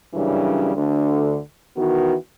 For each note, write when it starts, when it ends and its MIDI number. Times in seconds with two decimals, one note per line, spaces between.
0.14 0.72 42
0.14 0.72 49
0.14 0.72 52
0.14 0.72 55
0.14 0.72 62
0.75 1.39 38
0.75 1.39 50
1.77 2.15 51
1.77 2.15 52
1.77 2.15 59
1.77 2.15 66